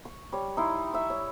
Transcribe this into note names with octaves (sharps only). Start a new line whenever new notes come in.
C#6
G3 C#5
D#4 E4 C6
E5 C#6
C#5